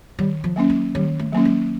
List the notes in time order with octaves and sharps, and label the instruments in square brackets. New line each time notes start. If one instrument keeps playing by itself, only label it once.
[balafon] D#3 [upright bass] G3
[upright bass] F3
[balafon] F#3 A#3 C#4
[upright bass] G#3
[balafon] D#3 [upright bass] G3
[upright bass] A3
[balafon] F#3 A#3 C#4
[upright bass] G#3